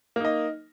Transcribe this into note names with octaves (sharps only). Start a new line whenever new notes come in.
A#3 D#4 D#5